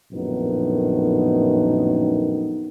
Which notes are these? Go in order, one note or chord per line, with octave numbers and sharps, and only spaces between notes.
A#1 F#2 A2 D#3 B3 D#4